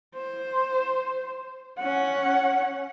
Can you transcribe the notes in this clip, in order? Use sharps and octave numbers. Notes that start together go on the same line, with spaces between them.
C5
C#4 F#5